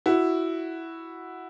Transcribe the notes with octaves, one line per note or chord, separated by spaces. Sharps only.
E4 F#4